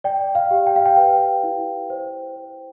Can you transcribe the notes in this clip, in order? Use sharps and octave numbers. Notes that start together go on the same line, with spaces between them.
D5 G5
F5
G4
G5
F5
G5
B4 G5
E4
C5
C5